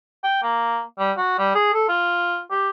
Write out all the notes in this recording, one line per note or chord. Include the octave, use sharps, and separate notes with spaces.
G5
A#3
G3
F#4
G3
G#4
A4
F4
G4